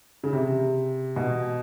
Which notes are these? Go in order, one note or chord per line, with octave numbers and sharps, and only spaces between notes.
C#3
C3
B2